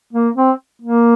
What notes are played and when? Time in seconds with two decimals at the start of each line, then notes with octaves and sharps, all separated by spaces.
0.13 A#3
0.36 C4
0.82 A#3